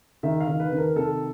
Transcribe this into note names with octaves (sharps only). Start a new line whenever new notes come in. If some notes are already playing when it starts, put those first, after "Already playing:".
D#3 E5
F5
D#3
B4
D#3
A#4
C3 A4